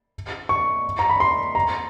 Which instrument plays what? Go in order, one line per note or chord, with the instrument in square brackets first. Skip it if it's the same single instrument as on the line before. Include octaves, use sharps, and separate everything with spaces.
[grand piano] C#6
A#5
B5
C6
A#5